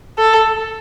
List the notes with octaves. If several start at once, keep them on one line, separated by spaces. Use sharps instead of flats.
A4